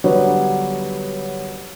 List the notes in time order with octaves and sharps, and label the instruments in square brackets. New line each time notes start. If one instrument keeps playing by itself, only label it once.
[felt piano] D3 F#3 G3 B3 B4 C#5